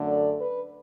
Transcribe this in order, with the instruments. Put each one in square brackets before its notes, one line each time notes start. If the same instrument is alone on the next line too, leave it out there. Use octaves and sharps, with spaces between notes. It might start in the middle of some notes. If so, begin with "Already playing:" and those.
Already playing: [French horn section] F#2 D3 A3
D5
B4